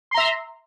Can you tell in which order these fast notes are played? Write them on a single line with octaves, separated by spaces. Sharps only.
C6 A#5 E5